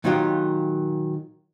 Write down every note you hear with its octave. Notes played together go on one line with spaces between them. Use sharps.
A#2 D#3 F#3 D#4 F4 G4